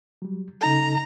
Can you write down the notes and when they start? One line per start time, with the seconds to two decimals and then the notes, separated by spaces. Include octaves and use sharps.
0.22 F#3 G3
0.61 C#3 D#4 A4 A#5